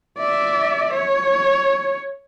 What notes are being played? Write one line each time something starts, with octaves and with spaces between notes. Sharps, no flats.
D5 E5
C#5